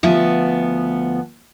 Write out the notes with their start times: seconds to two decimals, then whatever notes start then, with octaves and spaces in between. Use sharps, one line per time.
0.03 D2 F3 B3 E5